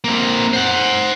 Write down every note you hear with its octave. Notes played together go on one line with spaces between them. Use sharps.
A#3 C4
C5 F#5